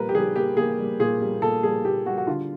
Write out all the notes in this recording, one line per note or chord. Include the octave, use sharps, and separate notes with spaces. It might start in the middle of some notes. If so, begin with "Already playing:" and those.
Already playing: A#2 G3 A#3 A#4 B4
G4
G3 G#4
A#3 G4
A#3 G#4
G3
A#2 G#4
G3
A#2 A4
G3 G#4
A#2 G4
G3 F#4
F#4
D3 F4